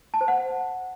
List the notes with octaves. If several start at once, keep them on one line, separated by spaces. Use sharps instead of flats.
A5
C5
F#5